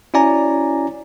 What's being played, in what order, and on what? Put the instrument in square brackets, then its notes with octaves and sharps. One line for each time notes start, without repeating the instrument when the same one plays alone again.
[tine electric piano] C#4 E4 F#4 D5 G#5 A#5